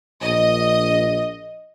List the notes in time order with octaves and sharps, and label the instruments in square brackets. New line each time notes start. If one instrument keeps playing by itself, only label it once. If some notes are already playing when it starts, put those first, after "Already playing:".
[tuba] A#1 [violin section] D#5